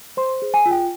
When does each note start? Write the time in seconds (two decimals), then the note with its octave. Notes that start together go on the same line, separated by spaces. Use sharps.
0.17 C5 C6
0.42 G#4
0.54 G#5
0.66 F4
0.71 G5